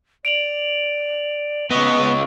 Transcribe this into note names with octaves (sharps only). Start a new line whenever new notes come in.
D5 D7 F7 F#7
C#2 B3 D#5 C#6